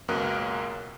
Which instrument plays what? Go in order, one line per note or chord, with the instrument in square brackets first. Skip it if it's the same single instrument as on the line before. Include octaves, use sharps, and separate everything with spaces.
[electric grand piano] C#2 F#2 B2 A#3 A#4 F#6